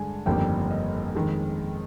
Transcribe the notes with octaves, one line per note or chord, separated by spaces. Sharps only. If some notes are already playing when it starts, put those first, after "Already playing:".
Already playing: G2 D3 G#3 G#5
G1 F2 D#3 G3 A#3 G5
D#5
F2 D#3 G#3